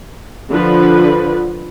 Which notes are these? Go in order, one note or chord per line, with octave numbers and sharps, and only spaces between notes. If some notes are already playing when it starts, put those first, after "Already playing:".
D3 F3 B4